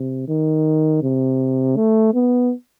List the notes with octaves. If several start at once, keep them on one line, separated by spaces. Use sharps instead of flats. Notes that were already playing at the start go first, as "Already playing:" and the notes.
Already playing: C3
D#3
C3
A3
B3